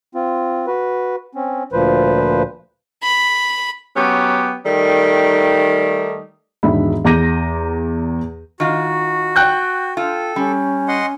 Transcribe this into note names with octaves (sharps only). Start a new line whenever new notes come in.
C4 F4
F#4 B4
C4 C#4
D2 A#2 F3 B4 C5
B5
F#3 B3 C#4 G4
D#3 G3 A3 D#4
E1 G#2 D#3 D4 E5 B5
E2 A#5 D6 G6 A#6 D#7
D#3 F4 F#4
G5 F#6 G6
F4 A4
G3 C#4
D#5 F#5 C6